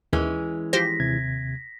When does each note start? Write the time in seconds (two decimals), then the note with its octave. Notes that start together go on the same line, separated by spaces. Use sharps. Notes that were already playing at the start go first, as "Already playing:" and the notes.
0.13 D#2 E3 G#3 C#4
0.73 F3 G4 C5 A#6 B6
1.00 D#2 C3 G#6